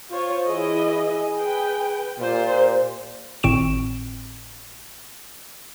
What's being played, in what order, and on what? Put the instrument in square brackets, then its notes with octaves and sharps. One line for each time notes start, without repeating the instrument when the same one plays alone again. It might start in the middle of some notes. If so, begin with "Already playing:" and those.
[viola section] F4 C5 C#5
[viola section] E3 E4 D#5 [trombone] G#4
[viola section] B4 G5
[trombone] A#2 [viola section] F4 G4 C5
[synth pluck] G#1 A2 C4 C#6 D7 E7